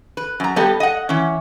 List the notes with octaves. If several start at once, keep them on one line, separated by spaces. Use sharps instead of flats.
B4
F#2 A#5
G3 B3 G4 A4 D#5
D#5 F#5
E3 C#4